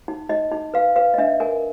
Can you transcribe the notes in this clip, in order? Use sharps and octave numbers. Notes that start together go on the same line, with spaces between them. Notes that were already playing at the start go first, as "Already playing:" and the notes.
D#4
D#4 D#5
D#4
B4 F5
B4 F5
D#5
D4 E5
A#4 G#5